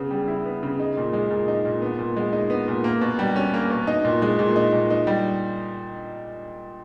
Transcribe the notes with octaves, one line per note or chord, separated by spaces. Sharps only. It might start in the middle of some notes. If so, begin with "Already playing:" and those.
Already playing: C#3 B3
G3
E4
B3
C#3
D#4
A#2
G#3
A#2
D#4
A#2
B3
A#2
G#3
D#4
B3
A#2
A#3
B2
G3
C#4
A#3
B2
D#4
A#2
G#3
A#2
D#4
A#2
D#4
G3